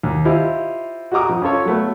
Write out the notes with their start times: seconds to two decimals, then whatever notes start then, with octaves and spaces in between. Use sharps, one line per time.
0.03 D#2
0.25 E4 F4 G4 C5 D#5 F5
1.12 F#4 G4 D#5 A#5 D6 D#6
1.29 F2
1.42 C#4 F4 A4 C#5
1.66 F#3 A3 B3